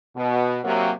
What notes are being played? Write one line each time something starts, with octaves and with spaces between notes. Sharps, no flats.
B2
C3 F#3 A#3